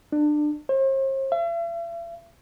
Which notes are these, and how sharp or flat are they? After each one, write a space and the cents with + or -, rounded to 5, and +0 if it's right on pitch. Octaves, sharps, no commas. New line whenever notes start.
D4 +25
C5 +45
E5 +45